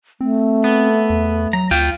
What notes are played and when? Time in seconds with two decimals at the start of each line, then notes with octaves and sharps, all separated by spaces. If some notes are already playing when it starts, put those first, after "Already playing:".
0.21 A3 C4
0.64 B3
1.10 E2
1.53 F#3 A#5
1.71 D2 F4 G5